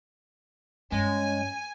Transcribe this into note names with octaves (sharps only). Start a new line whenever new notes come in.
G2 G#3 C#4 G#5